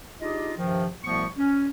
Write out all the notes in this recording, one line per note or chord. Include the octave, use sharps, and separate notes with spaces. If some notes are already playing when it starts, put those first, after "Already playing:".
D4 D#4 F4 G4 G#4 D#5
G2 C3 D#3 F3
C2 B2 F3 A3 B3 C#6
C#4